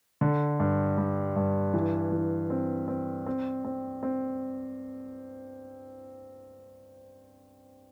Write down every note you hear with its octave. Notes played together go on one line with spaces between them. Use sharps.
D3
G2
G3
G2
E3
E3
C4
C4
C4
C4
C4